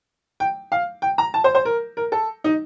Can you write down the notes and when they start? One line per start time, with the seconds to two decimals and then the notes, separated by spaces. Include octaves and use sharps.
0.40 G5
0.72 F5
1.02 G5
1.18 A#5
1.34 A5
1.44 C5
1.55 C5
1.65 A#4
1.97 A#4
2.12 A4
2.44 D#4